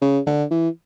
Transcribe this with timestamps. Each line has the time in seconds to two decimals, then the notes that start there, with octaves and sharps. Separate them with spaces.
0.02 C#3
0.27 D3
0.51 E3